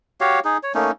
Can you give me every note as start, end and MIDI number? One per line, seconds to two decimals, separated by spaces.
0.21 0.40 66
0.21 0.40 67
0.21 0.40 73
0.21 0.40 77
0.45 0.57 63
0.45 0.57 68
0.63 0.72 73
0.75 0.91 57
0.75 0.91 58
0.75 0.91 61
0.75 0.91 63